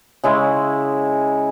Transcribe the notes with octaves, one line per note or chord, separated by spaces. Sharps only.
C#3 G#3 E4